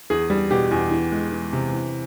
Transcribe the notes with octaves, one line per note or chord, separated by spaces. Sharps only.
E2 G#4
G3
B2 G4
E2
E3
G#3
E3
C3
E3